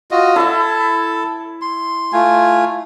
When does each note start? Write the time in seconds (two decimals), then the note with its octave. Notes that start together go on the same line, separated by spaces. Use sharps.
0.11 F4 F#4 D#5
0.36 E4 A4 E5 A5
1.61 C6
2.13 A3 F4 G#5